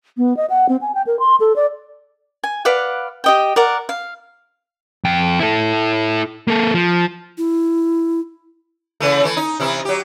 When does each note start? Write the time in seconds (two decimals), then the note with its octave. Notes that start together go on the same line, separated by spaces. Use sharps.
0.17 B3
0.37 D#5
0.50 F#5
0.69 C4
0.81 G#5
0.94 G5
1.07 A#4
1.19 C6
1.40 A4
1.56 D5
2.44 G#5
2.65 B4 D5 F5 F#5
3.24 G4 D#5 G5
3.56 A#4 D5 F#5
3.89 F5
5.04 F2 G5
5.39 E4 A4
6.48 A#3 A4
6.74 F3
7.38 E4
9.00 C#3 E3 A3
9.23 E3 A3
9.37 D#4
9.60 C3 E3 E4
9.85 F#3 G4